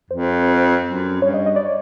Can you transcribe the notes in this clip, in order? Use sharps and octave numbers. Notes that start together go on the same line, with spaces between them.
F2 C5
C5
F#2
G2 C#5
D#5
D#5
D5
C#5